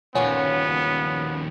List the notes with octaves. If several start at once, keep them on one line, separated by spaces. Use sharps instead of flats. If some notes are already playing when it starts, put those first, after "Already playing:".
D#2 A#2 F3 B3 C#4 F#4 C#5